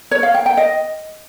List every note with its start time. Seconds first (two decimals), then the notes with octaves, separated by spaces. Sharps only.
0.11 C#5
0.23 F5
0.34 G5
0.46 G5
0.57 D#5